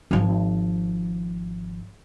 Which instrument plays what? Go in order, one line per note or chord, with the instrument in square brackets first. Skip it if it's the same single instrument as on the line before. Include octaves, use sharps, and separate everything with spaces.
[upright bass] G#1 F3